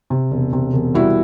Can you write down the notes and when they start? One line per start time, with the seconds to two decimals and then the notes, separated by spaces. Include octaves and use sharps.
0.10 C3
0.31 E1
0.53 C3
0.73 E1
0.94 G3 E4 F#4